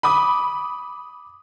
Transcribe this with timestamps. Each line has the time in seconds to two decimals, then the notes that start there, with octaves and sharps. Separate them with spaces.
0.03 B5 D6 D#6